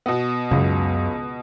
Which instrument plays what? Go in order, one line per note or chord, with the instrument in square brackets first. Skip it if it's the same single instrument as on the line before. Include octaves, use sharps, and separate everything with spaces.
[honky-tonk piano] B2 B3
[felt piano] C#2 [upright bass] F#2